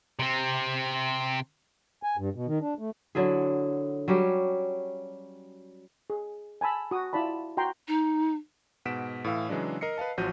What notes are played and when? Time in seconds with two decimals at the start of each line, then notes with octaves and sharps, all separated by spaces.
0.19 C3 C4
2.03 G#5
2.17 G2
2.35 B2
2.47 D#3
2.61 D4
2.79 A3
3.15 D3 F#3 E4 G#4
4.08 F#3 G3 C#4 G4
6.10 G#4
6.61 G#5 A5 B5 E6
6.91 F#4 D#6
7.13 E4 F4 D5 A5 B5
7.57 F#4 G5 A#5 C6
7.88 D#4
8.85 G#2 B2 F#5 B6 D7 E7
9.24 A2 E3 F5 E6
9.49 C#3 E3 F#3 G#3 D4
9.81 A#4 D#5 C7 C#7
9.98 B4 D#5 F5 A5
10.17 A1 F3 F#3 F#4 G6 D#7